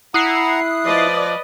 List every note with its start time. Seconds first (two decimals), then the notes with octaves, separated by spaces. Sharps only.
0.14 E4 F#5 A#5 D#6 F#6 C7
0.85 F3 B4 D5 D#5